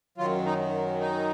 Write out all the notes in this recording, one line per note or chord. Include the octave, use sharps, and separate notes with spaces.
F#2 D#3 F#3 F4
D#4
D#4